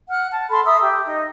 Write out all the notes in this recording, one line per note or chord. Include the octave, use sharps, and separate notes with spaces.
F#5 F6 F#6
A5
A4 A5 B5 C6
E5 A#5 D#6 E6
G4
D#4